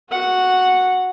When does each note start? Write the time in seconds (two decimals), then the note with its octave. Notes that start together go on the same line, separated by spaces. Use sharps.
0.10 F#4 F#5